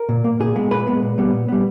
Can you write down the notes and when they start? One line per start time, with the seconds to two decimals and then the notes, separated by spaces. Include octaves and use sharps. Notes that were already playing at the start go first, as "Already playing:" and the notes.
Already playing: A#4
0.09 A#2
0.24 A#3
0.40 A#2 G#4
0.56 G#3 B3
0.71 A#2 B4
0.87 G#3 B3
1.02 A#2
1.18 G3 B3
1.33 A#2
1.48 G3 B3